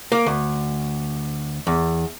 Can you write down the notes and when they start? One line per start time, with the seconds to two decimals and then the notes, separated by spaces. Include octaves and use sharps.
0.12 A#3
0.26 D2
1.67 E2